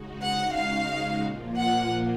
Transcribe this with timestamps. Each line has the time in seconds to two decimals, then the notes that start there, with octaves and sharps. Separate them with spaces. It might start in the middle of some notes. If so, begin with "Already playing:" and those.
Already playing: C#3 G#3 D#4 F#4
0.21 F#5
0.56 F5
1.25 A#2 F3 A#3 F4
1.59 F#5